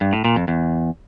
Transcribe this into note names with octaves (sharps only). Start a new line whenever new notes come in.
G2
A2
A#2
F2
E2